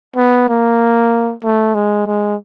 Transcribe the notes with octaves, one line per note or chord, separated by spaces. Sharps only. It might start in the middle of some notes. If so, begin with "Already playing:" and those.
B3
A#3
A3
G#3
G#3